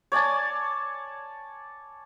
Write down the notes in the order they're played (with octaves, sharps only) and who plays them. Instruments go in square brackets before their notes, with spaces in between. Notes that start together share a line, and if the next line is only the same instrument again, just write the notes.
[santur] C#5 D5 G#5 A5